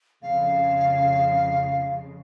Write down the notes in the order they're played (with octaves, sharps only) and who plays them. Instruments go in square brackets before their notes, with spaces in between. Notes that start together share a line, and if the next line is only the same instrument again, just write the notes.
[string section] F2 C#3 F3 G#3 [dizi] F5